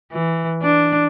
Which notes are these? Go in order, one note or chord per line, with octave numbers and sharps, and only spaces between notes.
E3
D4